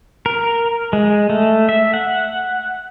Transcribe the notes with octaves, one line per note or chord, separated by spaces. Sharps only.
A#4
G#3
A3
E5
F#5